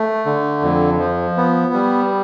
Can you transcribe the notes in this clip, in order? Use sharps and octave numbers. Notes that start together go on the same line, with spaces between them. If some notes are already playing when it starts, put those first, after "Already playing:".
Already playing: A3
D3
F2
F3
B3
G3